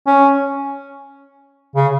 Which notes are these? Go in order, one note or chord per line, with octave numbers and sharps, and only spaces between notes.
C#4
C#3